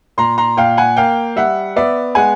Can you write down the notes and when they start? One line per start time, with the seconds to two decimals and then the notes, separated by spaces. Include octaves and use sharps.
0.18 A#2 A#5 C6
0.38 A#5 C6
0.57 A#2 F5 G5
0.77 F#5 G#5
0.97 A#3 F5 G5
1.36 G3 E5 F#5
1.76 B3 D5 E5
2.15 G#3 F#5 G#5